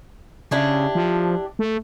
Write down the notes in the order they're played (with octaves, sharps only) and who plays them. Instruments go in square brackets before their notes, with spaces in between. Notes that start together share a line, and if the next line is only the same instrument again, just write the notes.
[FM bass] C#3 [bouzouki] D4 E4 G4
[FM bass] F3
A3